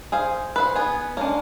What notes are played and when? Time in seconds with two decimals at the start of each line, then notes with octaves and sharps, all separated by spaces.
0.12 G#4 C5 F5
0.56 B4 C5 F#5
0.76 B3 G#4
1.17 G#3 A#3 C#4 D4